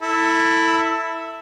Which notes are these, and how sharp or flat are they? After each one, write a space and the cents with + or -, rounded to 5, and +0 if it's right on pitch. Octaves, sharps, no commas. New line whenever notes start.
E4 +0 A4 +20